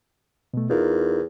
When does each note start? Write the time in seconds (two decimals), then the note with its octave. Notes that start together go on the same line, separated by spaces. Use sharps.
0.54 B2 A3
0.70 E2 D#4 F4 A#4